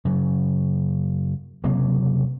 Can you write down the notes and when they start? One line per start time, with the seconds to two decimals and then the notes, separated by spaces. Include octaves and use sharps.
0.05 F#2 C#3 F#3
1.64 F#1 C3 F#3 A#3